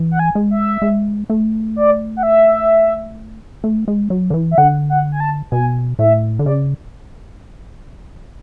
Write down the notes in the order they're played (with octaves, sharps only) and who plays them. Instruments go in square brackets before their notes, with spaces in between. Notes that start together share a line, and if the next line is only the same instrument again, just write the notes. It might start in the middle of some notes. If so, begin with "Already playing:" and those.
Already playing: [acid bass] E3
[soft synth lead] F#5
G#5
[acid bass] G#3
[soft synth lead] E5
[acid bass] G#3
A3
[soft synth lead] D5
F#5
E5
[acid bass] A3
G#3
F#3
D3
E3
[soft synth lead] E5
[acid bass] D3 [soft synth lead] F#5
[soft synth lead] F#5
G#5
A5
[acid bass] B2 [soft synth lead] G#5
[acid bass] A2 [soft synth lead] E5
[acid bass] D3
[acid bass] C#3 [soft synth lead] D5